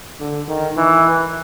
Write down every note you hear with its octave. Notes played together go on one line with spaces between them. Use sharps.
D3
D#3
E3